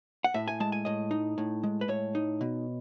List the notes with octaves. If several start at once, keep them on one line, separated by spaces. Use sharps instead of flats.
F#5
A2 E5
G#5
G#3 A5
G#5
A2 D#5
D#4
A2
G#3
B4
A2 C#5
D#4
B2